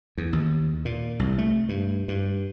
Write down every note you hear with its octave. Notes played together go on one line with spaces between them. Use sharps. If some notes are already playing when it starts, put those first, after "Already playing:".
E2
D#2
A#2
C2
A3
G2
G2